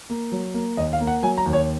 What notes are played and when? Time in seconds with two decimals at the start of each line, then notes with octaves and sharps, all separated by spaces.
0.10 A#3
0.32 F#3
0.54 A#3
0.77 D#2 D#5
0.93 F5
1.01 A#3
1.07 F#5
1.23 F#3 G#5
1.38 A#5
1.46 D#2
1.53 C#5